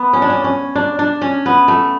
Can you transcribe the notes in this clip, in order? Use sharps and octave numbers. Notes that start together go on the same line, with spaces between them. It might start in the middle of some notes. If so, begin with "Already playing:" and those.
Already playing: B3
C#4
D4
C#4
C#4
D4
D4
C#4
B3
A3